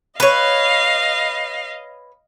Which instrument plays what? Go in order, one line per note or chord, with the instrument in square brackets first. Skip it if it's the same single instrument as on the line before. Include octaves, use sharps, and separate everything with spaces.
[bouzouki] B4 C#5 [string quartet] D#5 F5